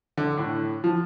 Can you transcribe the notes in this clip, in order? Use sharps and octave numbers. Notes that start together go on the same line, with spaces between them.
D3
A2
F3